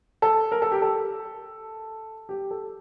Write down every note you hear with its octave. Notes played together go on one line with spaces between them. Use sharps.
A4
A#4
A4
G4
A4
G4
A4